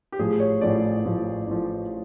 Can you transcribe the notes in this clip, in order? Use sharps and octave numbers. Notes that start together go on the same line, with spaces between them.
G4
A1 A2 F3 G#4
C#5
A1 A2 F3 D5
A1 A2 F3
A1 A2 F3